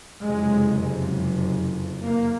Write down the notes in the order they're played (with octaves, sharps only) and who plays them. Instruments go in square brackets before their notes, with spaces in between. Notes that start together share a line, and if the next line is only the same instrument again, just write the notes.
[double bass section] F#1 F2 C3 G#3
A#3